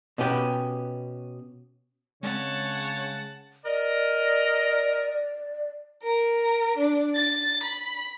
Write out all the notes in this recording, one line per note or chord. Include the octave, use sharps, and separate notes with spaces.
B2 B3 C#4 G4
C#3 G#3 C4 C#5 F#5 A5
A#4 D5 D#5
A#4
D4
A6
B5